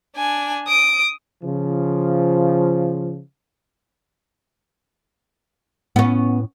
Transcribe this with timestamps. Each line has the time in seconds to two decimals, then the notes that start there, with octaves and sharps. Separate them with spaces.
0.16 D4 G#5
0.68 D#6 D7
1.43 C#3 F3
5.96 A2 B3 C#4